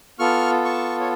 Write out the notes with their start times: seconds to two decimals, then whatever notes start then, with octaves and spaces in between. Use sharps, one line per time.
0.19 B3 F4 A4 C#6 F6
0.64 A5 C#6
1.00 C#5